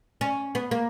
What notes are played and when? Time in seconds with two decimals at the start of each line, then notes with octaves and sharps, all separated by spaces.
0.21 C#4
0.55 B3
0.71 A#3